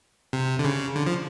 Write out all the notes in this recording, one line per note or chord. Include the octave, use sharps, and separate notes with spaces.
C3
D3
C#3
D3
F3